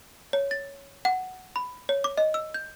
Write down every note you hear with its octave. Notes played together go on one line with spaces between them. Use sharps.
C#5
A6
F#5
B5
C#5
D6
D#5
E6
G6